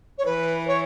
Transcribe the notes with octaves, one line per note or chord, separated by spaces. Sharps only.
C#5
E3 B4
C#5